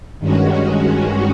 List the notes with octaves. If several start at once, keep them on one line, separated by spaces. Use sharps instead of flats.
G2 D#3 G#3 C#4 F#4